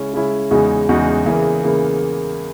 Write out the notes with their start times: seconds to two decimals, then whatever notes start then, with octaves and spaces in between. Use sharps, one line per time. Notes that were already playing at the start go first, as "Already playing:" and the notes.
Already playing: C#3 G#3 C#4 E4
0.13 C#3 G#3 C#4 E4
0.51 E2 C#3 G#3 D#4 F#4
0.89 E2 C#3 G#3 D#4 F#4
1.26 E2 C#3 E3 A#3
1.63 C#3 E3 A#3